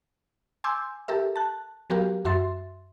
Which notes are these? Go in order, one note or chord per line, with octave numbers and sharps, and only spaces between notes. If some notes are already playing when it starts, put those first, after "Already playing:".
G#5 C6 D6 E6 G6
G4 A4 A#4 E5
A5 F#6
F#3 B3 F#4 G4 A#4 F5
F#2 F#4 E5 C6 A6